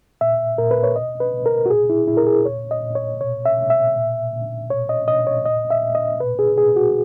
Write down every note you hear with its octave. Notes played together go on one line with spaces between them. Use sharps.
A#2 E5
A#2 A#4
B4
C#5
B2 D#5
B4
B2
A#4
F#4
A#2 G#4
E4
A#2 E4
A#4
G#4
A#2 C#5
D#5
A#2
C#5
B2 C#5
E5
B2
E5
A#2
A#2
B2 C#5
D#5
B2 D#5
C#5
A#2 D#5
E5
A#2
D#5
B2 B4
G#4
B2 G#4
F#4